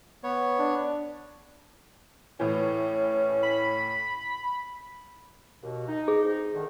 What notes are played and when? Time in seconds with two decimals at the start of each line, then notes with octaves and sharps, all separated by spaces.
0.24 B3 C#5
0.59 D4
2.40 A2 E3 C#4
3.43 B5
5.63 D#2 B2
5.88 D#4
6.08 G#4
6.25 G#2 C4 D#4
6.55 C2 D3 D#3